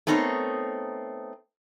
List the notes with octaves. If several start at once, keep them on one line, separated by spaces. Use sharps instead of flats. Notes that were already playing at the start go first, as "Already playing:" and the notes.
A3 B3 C4 D#4 A#4 C#5